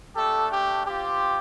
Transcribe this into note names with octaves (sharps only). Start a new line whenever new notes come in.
A3 D4 G4 A4
G4
C4 F4 G4